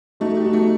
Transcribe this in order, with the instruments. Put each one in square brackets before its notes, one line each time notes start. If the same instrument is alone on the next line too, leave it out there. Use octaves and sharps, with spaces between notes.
[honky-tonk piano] A3 [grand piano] D#4 F#4
[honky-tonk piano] G4
[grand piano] D#4 F#4
[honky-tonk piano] A3